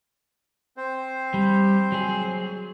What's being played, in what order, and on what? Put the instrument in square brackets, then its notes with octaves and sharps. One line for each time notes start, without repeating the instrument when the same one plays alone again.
[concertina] C4 C5
[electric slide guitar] G3
F#3 G#4